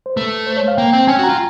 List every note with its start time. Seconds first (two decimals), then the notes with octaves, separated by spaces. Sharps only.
0.06 C5
0.16 A3 B4
0.47 C5
0.57 C#5
0.68 F5
0.77 A#3 G5
0.93 C4 G5
1.08 C#4 G#5
1.19 F#4
1.24 A#5
1.29 F4